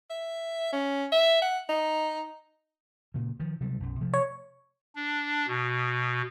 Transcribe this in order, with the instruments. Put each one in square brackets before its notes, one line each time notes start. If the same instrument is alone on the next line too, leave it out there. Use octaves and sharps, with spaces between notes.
[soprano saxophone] E5
C#4
E5
F#5
D#4
[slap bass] A#2 C#3
D#3 F3
C3 F#3 G3
B1 F#2
C3 F3 A3
[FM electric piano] C#5
[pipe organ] D4
B2